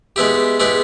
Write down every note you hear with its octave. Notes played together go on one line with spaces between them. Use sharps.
G#3 B3 E4 G4
G#3 B3 E4 G4